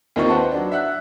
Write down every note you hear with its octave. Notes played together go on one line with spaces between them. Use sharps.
D#2 A#3 C4 D#4 F4 C#6
B4 C5 F#5 A5
F#3 D4
E5 F#5 F#6